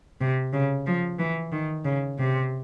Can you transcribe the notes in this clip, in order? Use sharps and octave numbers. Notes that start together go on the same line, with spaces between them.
C3
C#3
F3
E3
D#3
C#3
C3